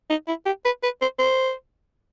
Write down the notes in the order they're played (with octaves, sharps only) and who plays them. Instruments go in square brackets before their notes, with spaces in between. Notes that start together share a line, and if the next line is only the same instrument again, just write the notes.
[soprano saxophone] D#4
E4
G4
B4
B4
C5
C5